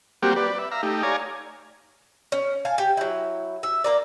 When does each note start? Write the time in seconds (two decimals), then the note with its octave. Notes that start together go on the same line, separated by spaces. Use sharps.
0.23 G3 A#3 C4 F#4 G4
0.36 B4 D5
0.58 E5
0.71 E5 F5 A#5
0.83 A3 D#4 G4
1.03 C#5 D5 F5 G#5 A#5
2.32 C#4
2.65 F5 G#5 A5
2.78 G4
2.97 F#3 E4
3.63 E5
3.84 A#3 A#4 D5